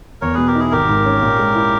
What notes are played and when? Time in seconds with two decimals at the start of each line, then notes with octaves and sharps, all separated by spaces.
0.21 E2 A#4 C#5
0.34 B2 G#4 B4
0.47 G4 A#4
0.55 D#4 E4 G#4
0.71 G#1 G4 A#4
0.89 G#2
1.06 C#4
1.22 A#2
1.39 G#3
1.55 E4